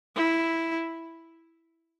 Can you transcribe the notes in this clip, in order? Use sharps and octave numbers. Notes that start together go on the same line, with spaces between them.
E4